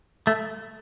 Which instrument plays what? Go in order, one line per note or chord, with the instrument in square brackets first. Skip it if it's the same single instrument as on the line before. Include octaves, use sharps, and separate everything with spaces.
[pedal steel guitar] A3